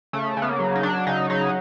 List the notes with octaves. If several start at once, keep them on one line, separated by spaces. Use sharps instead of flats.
C#3 A3
C#3
B3
A#3
F#3
D#4
F#3 D4
C#3 D#4
F#3 D#4